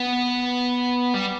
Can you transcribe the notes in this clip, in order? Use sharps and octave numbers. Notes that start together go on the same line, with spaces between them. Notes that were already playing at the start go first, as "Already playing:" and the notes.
Already playing: B3
G3